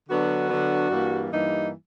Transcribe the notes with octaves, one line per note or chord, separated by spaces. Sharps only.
D3 F#3 B3 D4 F#4
D3 F#3 B3 D4
G2 E3 G3 A#3
G2 E3 G3 A#3 D#4